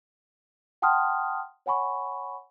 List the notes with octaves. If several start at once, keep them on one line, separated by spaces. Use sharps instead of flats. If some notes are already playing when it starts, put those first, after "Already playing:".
F#5 G5 A5 C6 D#6 F6
C#5 F#5 G#5 B5 C#6